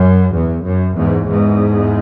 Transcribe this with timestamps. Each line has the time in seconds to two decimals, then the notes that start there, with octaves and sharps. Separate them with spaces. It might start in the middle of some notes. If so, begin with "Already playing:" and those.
Already playing: F#2
0.34 E2
0.65 F#2
0.96 E2 G#2
1.28 E2 G#2